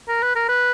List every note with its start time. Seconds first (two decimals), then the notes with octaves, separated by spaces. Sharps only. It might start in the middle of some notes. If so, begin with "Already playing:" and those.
0.08 A#4
0.22 B4
0.36 A#4
0.49 B4